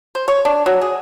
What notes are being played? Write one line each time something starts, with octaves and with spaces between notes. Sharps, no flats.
C5
C#5
D4
F#3
G#4